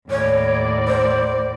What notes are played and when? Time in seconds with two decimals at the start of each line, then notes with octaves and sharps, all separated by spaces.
0.10 D#2 A2 C#5 D5
0.88 C5